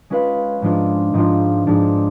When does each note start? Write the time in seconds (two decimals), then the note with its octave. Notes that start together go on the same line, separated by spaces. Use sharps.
0.10 G#3 C#4 F4 B4 F5
0.62 G#2 F3 G#3 D4 F4
1.14 G#2 F3 G#3 D4 F4
1.67 G#2 F3 G#3 D4 F4